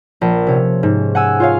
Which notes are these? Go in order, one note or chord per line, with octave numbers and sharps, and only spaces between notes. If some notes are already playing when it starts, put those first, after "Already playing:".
A#1
C3 C#4
G#2
F#5 G#5 E6
F4 C#5 F5